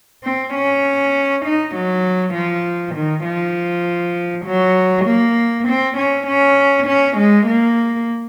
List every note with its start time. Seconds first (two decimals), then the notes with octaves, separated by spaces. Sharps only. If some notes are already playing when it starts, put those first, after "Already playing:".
0.23 C4
0.53 C#4
1.44 D#4
1.74 F#3
2.34 F3
2.95 D#3
3.25 F3
4.45 F#3
5.06 A#3
5.66 C4
5.97 C#4
6.27 C#4
6.87 C#4
7.17 G#3
7.47 A#3